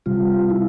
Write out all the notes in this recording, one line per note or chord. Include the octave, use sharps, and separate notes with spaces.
C3 G3 F4
E4